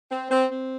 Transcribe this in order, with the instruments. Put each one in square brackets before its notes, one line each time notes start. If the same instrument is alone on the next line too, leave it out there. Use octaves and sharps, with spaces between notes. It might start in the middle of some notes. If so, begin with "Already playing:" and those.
[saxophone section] C4
C4
C4